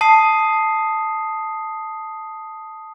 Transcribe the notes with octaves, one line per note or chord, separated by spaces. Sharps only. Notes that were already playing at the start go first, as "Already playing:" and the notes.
A5 D#6 C7